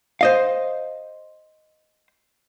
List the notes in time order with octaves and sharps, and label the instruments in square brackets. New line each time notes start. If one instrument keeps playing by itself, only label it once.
[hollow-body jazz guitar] C5 D#5 F5